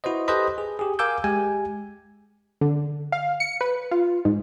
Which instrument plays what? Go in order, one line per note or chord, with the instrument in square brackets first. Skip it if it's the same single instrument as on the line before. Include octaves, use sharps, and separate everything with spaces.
[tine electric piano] E4 F#4 B4 C5 D#5
G4 A4 B4 C5 D#5 B5
G#4
G4 G#4
A#4 F5 G#5 D6 E6 G6
G#3 G4 G#5
[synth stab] D3
F5
C#7
B4
F4
G#2